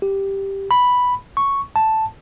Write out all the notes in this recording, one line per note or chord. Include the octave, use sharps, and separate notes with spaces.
G4
B5
C#6
A5